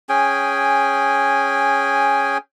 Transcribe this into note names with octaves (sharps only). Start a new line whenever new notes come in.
C#4 G#4 G5 G#5